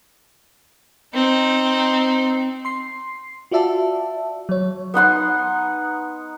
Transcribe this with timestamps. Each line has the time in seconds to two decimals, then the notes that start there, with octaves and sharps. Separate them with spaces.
1.14 C4 D#4
2.65 C6 C7
3.51 F4 F#4 D5 E5 A5
4.49 F#3 C#5
4.94 B3 D#4 F#5 C6